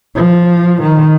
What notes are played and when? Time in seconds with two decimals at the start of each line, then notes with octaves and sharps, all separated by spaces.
0.15 F3
0.82 D#3